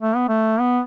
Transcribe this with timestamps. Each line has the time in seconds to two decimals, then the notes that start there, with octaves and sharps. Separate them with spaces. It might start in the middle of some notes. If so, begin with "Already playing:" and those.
0.02 A3
0.16 B3
0.29 A3
0.60 B3